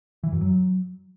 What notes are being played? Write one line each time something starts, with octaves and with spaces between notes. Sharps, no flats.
E3
F#2
F#3